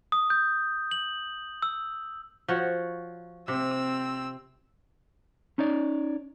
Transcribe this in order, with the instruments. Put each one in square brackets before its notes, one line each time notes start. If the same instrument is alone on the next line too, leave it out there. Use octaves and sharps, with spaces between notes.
[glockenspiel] D#6
G6
F#7
E6
[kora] F3 F#4 C#5
[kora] C3 [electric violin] C4 E6
[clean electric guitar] C#4 D#4 C#5 D5